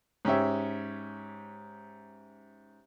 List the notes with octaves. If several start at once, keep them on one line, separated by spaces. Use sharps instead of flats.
G#2 C#4 G4 E5